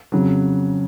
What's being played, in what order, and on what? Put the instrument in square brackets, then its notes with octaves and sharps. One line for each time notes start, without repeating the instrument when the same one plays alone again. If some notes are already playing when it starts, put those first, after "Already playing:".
[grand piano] F2 C#3 F#3